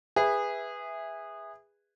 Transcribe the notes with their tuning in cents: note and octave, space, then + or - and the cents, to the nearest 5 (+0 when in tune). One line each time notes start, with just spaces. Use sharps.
G#4 -20 B4 +0 E5 -5